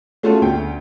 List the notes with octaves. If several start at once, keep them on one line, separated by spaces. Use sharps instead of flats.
A3 C#4 F4 F#4 G#4 A4
D2 G5